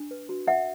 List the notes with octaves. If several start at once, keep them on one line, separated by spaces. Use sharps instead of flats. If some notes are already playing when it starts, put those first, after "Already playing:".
Already playing: D4
B4
F#4
C#4 E5 F#5